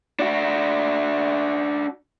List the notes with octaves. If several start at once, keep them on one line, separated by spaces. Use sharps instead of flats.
D4 F#4